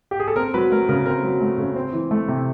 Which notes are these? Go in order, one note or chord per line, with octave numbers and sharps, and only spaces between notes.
G4
G#4
A4
C4 A#4
F#3 B4
A3 A#4
C#3 A#4
C4 A#4
F#3
A3
C#3
C4
E3
A3
C3